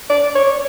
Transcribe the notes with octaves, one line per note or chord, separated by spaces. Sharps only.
D5
C#5